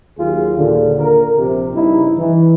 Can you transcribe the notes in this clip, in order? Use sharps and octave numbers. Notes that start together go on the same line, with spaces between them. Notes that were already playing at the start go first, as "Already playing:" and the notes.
D#2 F#3 F4 G#4
D#2 A#2 D3
A#4
A#1 C3
G2 C#3 D#4 E4
E3